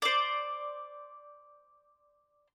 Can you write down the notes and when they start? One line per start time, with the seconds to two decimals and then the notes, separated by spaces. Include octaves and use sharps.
0.02 C5 D5